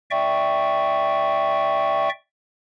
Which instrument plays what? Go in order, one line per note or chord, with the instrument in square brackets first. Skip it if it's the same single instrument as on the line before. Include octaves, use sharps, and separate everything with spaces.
[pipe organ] D5 E5 G5 C#6